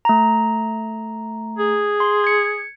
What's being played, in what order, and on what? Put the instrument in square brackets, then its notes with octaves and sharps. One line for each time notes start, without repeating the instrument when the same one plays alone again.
[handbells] A3 A#5
[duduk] G#4
[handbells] C6
G#6 C#7